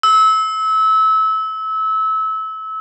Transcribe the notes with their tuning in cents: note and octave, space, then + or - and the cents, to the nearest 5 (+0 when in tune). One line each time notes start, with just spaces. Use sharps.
E6 -25